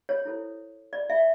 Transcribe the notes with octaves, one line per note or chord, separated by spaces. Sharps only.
C#5
E4 A4 C5
D5
E5